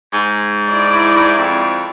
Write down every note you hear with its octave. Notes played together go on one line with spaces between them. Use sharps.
G#2
E4 D5
F2